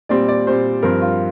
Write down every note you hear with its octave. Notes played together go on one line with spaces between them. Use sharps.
A#2 G3 C4 D5
D5
A#2 G3 C4 C5
G2 F3 C4 A#4
F4